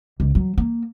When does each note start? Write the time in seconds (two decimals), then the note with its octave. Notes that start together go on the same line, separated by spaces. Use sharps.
0.20 C#2
0.35 F#3
0.58 A#3